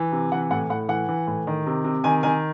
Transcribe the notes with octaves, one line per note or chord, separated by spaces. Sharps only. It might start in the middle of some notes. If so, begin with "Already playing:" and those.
Already playing: E3
C3
E3 F#5
A2 F#5
A2 F#5
E3 F#5
E3
A2
D#3
C3
C3
D#3 G#5
D#3 G#5